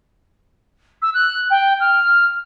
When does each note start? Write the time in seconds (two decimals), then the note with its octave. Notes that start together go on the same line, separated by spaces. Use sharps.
1.02 E6
1.14 F#6
1.50 G5
1.80 F6